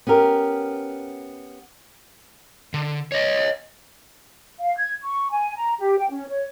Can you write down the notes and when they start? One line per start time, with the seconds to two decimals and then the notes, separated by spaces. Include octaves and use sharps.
0.07 B3 C#4 G4 A#4
2.74 D3
3.12 C#5 D#5
4.60 F5
4.77 G#6
5.03 C#6
5.31 G#5
5.57 A#5
5.79 G4
5.98 G5
6.10 C#4
6.28 C#5